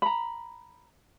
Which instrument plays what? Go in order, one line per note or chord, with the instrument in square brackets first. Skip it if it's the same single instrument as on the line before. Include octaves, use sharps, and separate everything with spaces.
[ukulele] A#5 B5